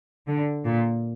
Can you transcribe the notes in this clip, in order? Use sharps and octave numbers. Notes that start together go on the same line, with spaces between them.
D3
A#2